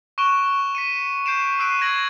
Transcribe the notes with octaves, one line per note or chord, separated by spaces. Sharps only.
C#6 F#6 D7 E7 G7
B6 C#7 D#7
G6 C7 D7 E7
E6 F#6 C7 D7 D#7
G#6 A#6 D7 E7 F#7